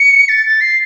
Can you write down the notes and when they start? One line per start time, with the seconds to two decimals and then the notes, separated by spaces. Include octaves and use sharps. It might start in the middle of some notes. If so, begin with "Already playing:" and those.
Already playing: C#7
0.29 A6
0.46 A6
0.61 C7